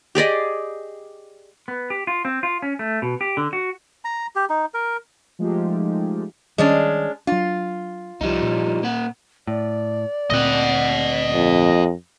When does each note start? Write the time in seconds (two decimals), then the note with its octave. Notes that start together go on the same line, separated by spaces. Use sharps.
0.15 G4 G#4 D5 D#5
1.68 B3
1.90 G4
2.07 F4
2.25 C4
2.43 F4
2.62 C#4
2.79 A3
3.02 B2
3.21 G4
3.37 D3
3.53 F#4
4.05 A#5
4.36 G4
4.50 D#4
4.74 A#4
5.39 F3 G#3 A3 D#4 F4 G4
6.58 D#3 G3 G#3 C#4 D4
7.27 F#3 D4 F4
8.21 C2 F3 G3 D#4
8.42 A#2
8.83 A#3 F#5
9.47 A2 D5
10.30 D2 A#2 C4 D#5 F#5
11.34 F2